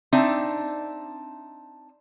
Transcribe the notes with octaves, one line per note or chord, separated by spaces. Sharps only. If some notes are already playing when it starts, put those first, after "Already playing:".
C4 D4 D#4 E5